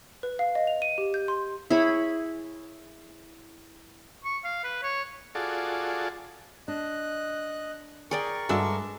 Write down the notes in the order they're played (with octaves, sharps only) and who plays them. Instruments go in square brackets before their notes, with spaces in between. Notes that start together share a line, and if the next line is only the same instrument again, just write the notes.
[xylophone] B4
F5
D#5
F7
D#7
G4
G6
C6
[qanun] E4 G#4 C#5 B5
[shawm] C#6
F5
B4
C#5
[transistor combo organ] F4 F#4 G#4 A4 D5
[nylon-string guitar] D4 [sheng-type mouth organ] D#5 F#6
[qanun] G#4 D5 G5 [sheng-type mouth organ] A#4 C#6
[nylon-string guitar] G2 A4 [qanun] G#3 [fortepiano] D4 F#4 E5